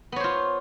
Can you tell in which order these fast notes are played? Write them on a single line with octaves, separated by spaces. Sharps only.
B3 C#5 C5 F4